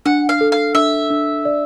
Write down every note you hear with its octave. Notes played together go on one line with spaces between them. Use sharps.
D4 F#5
F5
A4
F5
D4 E5
D4
D5